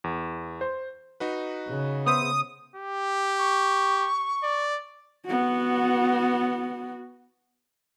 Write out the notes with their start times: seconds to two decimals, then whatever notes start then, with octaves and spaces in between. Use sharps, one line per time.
0.04 E2
0.61 C5
1.20 D#4 F#4 B4
1.68 C#3
2.07 B3 C5 E5 D#6
2.76 G4
3.38 C#6
4.43 D5
5.26 B3 F#4